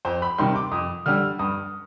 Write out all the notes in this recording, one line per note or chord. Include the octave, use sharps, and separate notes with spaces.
F2 C5
B5
C3 D#3 G3 C6
D6
F2 D#6
D3 G3 F6
G2 D#6